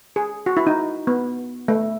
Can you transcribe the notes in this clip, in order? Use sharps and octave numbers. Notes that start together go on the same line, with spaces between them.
G#4
F#4
E4
D#4
B3
A3